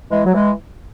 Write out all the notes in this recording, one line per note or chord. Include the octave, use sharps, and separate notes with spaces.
E3 G#3
F#3
E3 G#3